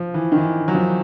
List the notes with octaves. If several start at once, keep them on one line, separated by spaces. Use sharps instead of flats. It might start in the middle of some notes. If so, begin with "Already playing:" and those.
Already playing: F3
E3
D#3
E3
F#3
F3